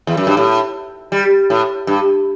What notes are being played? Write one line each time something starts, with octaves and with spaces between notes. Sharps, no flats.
E2
F#2
G2
A2
G3
A2
G2